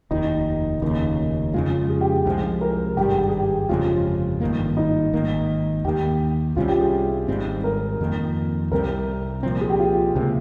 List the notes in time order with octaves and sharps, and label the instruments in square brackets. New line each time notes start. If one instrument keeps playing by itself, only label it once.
[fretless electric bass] F1 D#2 D#3 [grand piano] D#4
[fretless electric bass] F1 D#2 C#3 [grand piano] D#4
[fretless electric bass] F2 C#3 G#3 [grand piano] F4
[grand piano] G#4
G4
G#4
[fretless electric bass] C2 C3 F3 G#3
[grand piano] A#4
[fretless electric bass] G#1 G2 G3 [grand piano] G4
[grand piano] G#4
G4
G#4
G4
[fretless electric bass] G1 F2 C#3 G#3 [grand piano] F4
[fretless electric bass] G#1 G2 D#3 A#3
[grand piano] D#4
[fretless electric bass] G#1 G#2 D#3 A#3
[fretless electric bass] D#2 D#3 A#3 [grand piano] G4
[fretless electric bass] C2 C3 G3 C#4 [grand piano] F4
[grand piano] G4
G#4
[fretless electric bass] G#1 G#2 G3 C4
[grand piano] A#4
[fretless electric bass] F2 D#3 A#3
[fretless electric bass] C2 C3 G3 C4 [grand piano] A#4
[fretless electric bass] C2 A#2 F3 C4
[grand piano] G#4
G4
F4
[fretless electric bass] C#2 C3 F3 A#3